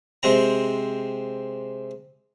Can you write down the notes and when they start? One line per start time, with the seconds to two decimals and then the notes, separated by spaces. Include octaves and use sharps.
0.23 C3 G#3 C4 A#5